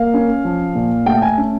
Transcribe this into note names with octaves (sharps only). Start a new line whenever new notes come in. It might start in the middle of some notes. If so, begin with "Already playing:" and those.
Already playing: A#3 F5
C#4
F3
A#2
A3 G5
G#5
C#4